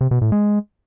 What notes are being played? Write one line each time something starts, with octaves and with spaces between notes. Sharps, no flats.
C3
B2
A2
G#3